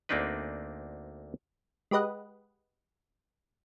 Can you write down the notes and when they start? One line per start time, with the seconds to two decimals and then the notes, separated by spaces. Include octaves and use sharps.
0.09 D2 A#3 C4 D4 D#4 B4
1.91 G#3 G4 B4 D#5 F#5